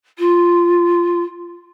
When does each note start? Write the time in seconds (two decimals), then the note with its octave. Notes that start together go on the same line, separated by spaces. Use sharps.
0.18 F4